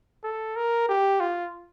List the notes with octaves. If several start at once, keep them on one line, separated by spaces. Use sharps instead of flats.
A4
A#4
G4
F4